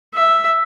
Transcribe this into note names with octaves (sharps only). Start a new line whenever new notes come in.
E5